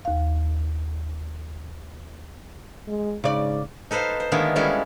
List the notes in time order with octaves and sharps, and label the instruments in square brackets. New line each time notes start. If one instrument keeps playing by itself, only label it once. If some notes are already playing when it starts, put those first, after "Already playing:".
[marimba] D#2 F5
[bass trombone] G#3
[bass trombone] G#2 [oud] C#3 D5
[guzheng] D#4 A4 B4 C5 F5
C5
D3 D#3 G#3 A#3 B3 E4
G3 G#3 C#4 E4 A4 F5